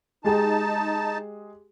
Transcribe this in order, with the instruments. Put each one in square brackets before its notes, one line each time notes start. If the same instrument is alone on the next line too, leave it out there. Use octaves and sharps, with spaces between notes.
[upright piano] G#3 G4 G#4 [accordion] D#4 A5